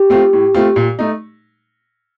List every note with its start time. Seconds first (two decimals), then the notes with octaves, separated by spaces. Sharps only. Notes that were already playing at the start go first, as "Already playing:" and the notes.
Already playing: G4
0.10 A3 C4 F4
0.33 A2
0.55 A3 C4 F4
0.76 A#2
0.99 A3 D#4